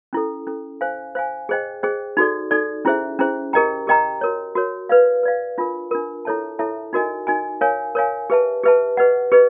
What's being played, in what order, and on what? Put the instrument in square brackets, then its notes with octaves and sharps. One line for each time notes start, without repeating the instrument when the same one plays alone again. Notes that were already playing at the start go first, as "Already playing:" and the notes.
[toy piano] C#4 E4 A4
C#4 E4 A4
C5 F5 G#5
C5 F5 G#5
G#4 C5 D#5 G5
G#4 C5 D#5 G5
D#4 F#4 A4 D5
D#4 F#4 A4 D5
C#4 E4 G#4 C5 E5
C#4 E4 G#4 C5 E5
G4 A#4 D#5 G5 A#5
G4 A#4 D#5 G5 A#5
F#4 A#4 C#5
F#4 A#4 C#5
B4 D5 F5
B4 D5 F5
D4 F4 A#4
D4 F4 A#4
E4 A4 C#5 E5 A5
E4 A4 C#5 E5 A5
D#4 F#4 A#4 D#5 G#5
D#4 F#4 A#4 D#5 G#5
A#4 C#5 F5 G#5
A#4 C#5 F5 G#5
G4 B4 E5 A5
G4 B4 E5 A5
G4 B4 D#5 F#5
G4 B4 D#5